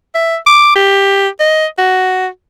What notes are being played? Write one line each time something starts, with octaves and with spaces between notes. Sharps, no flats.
E5
D6
G4
D#5
F#4